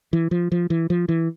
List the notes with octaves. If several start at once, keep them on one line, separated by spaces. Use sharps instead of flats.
E3
F3
F3
E3
F3
E3